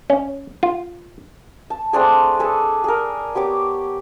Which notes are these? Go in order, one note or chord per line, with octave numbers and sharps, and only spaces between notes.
C#4
F4
A5
A3 C4 D4 G#4
G#4 A4 B4
G#4 A#4
B3 G4 C#5 D6